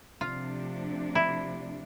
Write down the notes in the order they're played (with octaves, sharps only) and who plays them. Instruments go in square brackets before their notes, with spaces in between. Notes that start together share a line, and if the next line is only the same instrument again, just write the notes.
[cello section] C3 F3 A3 D4 [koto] F4
[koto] E4